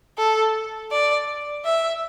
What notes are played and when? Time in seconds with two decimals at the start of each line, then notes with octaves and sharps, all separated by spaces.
0.18 A4
0.91 D5
1.65 E5